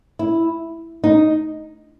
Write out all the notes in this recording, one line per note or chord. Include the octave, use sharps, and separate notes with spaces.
E4
D#4